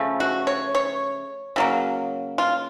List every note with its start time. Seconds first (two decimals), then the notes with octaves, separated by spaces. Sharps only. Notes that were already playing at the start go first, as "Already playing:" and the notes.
Already playing: C#3 F3 A3
0.20 F#4
0.47 C#5
0.75 C#5
1.56 C#3 F#3 A#3
2.38 F4